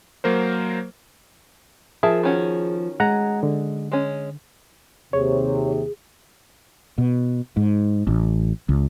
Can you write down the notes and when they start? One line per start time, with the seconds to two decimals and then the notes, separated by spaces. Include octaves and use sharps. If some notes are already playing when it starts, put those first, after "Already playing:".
0.24 F#3 A#3 A#4 C5
2.03 F3 G#4 A#4 E5 A5
2.23 D#3 C#4 F#4
3.00 G#3 F#5 A#5
3.43 D3
3.92 G#3 C#4
5.13 D#2 C3 G#4 C#5
6.98 B2
7.57 G#2
8.07 A1
8.69 C#2